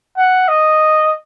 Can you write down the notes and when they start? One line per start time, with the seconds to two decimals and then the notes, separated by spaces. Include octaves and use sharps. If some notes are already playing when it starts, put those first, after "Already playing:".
0.17 F#5
0.48 D#5